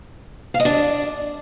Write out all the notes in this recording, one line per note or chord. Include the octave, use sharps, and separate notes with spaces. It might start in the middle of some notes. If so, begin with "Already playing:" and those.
F5
D#5
D4